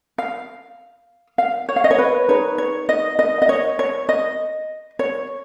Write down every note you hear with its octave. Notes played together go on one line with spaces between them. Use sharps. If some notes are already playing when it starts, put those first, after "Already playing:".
F5
F5
C#5
F5
D#5
C#5
B4
D#4 G#4 B4 C#5
C#5
D#5
D#5
D#5
C#5
C#5
D#5
C#5